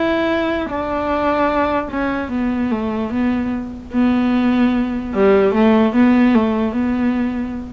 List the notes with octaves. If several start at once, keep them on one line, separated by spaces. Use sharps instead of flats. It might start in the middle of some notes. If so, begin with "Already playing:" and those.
Already playing: E4
D4
C#4
B3
A3
B3
B3
G3
A3
B3
A3
B3